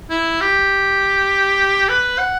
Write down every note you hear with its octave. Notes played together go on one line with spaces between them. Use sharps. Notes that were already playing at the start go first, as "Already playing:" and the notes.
E4
G4
B4
F#5